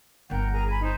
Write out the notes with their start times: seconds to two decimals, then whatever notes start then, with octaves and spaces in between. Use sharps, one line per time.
0.30 G1 D3 A#4 F#5 G5
0.53 G#4 A#4 A#5
0.69 G#5 B5
0.81 D#4 C5